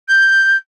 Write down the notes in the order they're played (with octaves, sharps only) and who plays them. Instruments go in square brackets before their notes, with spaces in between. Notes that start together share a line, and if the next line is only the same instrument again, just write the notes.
[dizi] G6